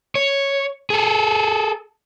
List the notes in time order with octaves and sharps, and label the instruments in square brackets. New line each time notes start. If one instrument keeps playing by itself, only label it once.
[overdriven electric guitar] C#5
G#4 A4